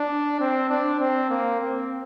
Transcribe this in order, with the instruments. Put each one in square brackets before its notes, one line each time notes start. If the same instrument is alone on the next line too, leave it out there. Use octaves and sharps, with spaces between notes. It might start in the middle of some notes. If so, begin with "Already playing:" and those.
Already playing: [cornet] D4
C4
D4
C4
A#3
C4